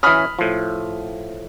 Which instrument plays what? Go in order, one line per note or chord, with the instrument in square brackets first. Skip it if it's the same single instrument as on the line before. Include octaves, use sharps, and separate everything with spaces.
[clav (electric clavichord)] E3 C#4 [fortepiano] B5 D#6 F6
[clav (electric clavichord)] A2 F3